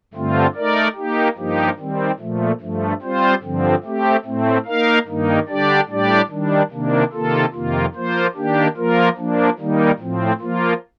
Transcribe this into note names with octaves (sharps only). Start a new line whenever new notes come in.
G2 D3 A3 C4 F4
A3 D#4 A#4 D5
A#3 D#4 G4
G2 F3 A#3 D#4 G4
D#3 G3 C4
A#2 F3 A3
G2 F3 A3
G3 C4 F4 C5
G2 D3 F3 C4
A3 C4 G4
A2 A3 C4
A#3 D#4 A#4 F5
G2 D#3 A#3 D#4
D3 G3 D4 G4 D5
A2 G3 D4 G4 D5
D#3 G3 D4
C3 D#3 A#3 D4
C3 D#3 A#3 F4 A4
F2 C3 D#3 A#3 F4
F3 A#3 F4 C5
D#3 A#3 D4 G4
F3 A#3 F4 A#4
F3 A#3 D4
D#3 G3 A#3 D#4
A2 F3 C4
F3 A#3 F4